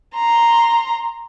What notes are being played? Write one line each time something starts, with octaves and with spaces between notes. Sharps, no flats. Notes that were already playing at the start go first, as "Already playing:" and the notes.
A#5 C6